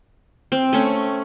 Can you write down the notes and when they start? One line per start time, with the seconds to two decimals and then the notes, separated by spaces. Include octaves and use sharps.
0.52 C4
0.73 A3 C#4